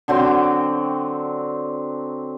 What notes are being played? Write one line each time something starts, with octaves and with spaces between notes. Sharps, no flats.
D3 F#3 C4 G5